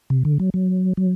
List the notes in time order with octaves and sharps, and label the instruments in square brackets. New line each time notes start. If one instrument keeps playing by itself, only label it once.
[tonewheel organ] C3
D3
F#3
F#3
F#3